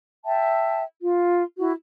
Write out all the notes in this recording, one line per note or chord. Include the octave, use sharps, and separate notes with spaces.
E5 G5 A5
F4
E4 F#4